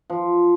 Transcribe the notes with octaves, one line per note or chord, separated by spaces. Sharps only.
F3